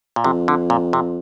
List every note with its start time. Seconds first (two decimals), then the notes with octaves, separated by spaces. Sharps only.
0.16 A#2
0.24 F2 C3
0.48 D3
0.70 A#2
0.93 C3